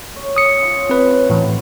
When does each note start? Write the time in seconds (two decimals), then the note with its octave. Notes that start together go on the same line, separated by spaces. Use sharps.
0.16 C#5
0.36 D#6 C#7
0.59 C#4 F4
0.90 A2 C#3 C4 B4
1.30 A2 E3 F#4 C5